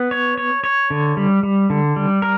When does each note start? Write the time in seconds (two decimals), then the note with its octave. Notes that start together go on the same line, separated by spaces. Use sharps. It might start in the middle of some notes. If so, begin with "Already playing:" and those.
Already playing: B3
0.11 C#5
0.38 C#5
0.64 C#5
0.90 D3
1.17 G3
1.43 G3
1.70 D3
1.96 G3
2.22 A#4